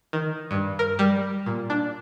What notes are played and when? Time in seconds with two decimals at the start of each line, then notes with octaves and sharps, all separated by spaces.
0.13 D#3
0.51 G2
0.79 A#4
0.99 G3
1.46 A#2
1.70 D4